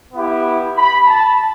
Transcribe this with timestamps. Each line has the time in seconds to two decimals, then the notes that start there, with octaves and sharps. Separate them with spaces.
0.13 B3 E4 G4
0.76 B5
1.07 A5